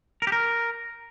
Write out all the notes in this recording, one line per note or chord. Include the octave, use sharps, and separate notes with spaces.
A#4
G4
A#4